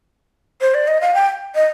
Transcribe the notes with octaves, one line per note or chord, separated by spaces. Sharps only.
C5
D5
D#5
F5
G5
D#5